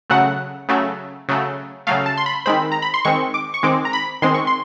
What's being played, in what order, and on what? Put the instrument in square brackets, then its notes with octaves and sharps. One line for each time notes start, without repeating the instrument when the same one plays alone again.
[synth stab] C#3 F#3 A3 F#5
C#3 F#3 A3
C#3 F#3 A3
C#3 F#3 A3 F5
A5
C6
B5
D#3 G#3 C4 B5
A#5
B5
C6
D#3 G#3 C4 C#6
D6
C#6
D#3 G#3 C4 D6
A#5
B5
D#3 G#3 C4 C6
C#6
C6